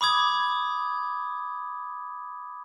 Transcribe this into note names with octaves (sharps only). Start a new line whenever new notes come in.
B5 D6 D#6 G#6